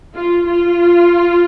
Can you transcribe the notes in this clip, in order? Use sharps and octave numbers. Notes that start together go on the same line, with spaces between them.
F4
F4